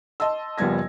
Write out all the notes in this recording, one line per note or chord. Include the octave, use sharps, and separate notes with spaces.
D#5 A5 C6 E6
F#1 F3 G3 B3 G#6 A#6